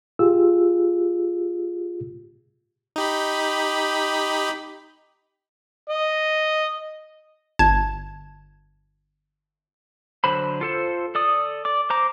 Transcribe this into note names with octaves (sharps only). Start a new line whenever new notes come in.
F4 G4 G#4 E6
D#4 G4 B5
D#5
G1 A5 G#6
D3 F#3 C5 B5
F4 A4 C5
A4 D5 D#6
D5 D6
C5 A#5 D6